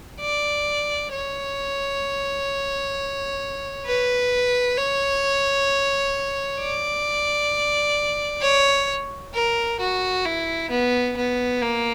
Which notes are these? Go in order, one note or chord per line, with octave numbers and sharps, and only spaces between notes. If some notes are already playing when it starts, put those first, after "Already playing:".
D5
C#5
B4
C#5
D5
C#5
A#4
F#4
E4
B3
B3
A#3